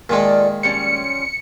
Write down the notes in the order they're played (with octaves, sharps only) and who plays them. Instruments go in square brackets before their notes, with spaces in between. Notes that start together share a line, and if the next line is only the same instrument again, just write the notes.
[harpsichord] A#2 D#3 G#3 [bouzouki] F4 A4 D5
[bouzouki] F3 G3 C#4 [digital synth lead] C#7